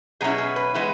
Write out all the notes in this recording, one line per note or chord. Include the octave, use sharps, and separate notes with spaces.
B2 F#3 C#4 E4 G#4
G#4
B4
E3 G#3 B3 E4 B4